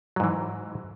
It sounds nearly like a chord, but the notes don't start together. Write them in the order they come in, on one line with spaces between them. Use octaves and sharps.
F#3 G#2 E3